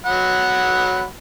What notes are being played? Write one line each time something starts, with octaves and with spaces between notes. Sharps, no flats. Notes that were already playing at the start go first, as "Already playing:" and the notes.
F#3 F#5 B5